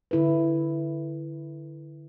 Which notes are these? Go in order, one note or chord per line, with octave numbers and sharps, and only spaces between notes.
D3 E4 A4 B4